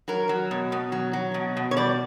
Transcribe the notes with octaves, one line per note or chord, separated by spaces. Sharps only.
F#3 A#4
F#3
B2
B2
F#3
F#3
B2
B2
C#5
G3 D5